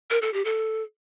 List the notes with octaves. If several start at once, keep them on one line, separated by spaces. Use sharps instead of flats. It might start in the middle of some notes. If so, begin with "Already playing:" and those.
A#4
A4
G4
A4